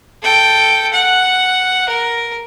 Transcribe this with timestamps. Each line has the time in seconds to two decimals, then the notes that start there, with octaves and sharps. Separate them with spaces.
0.22 A4 G5
0.93 F#5
1.89 A#4